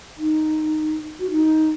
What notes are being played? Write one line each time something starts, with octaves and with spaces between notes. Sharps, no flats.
D#4
F#4
D#4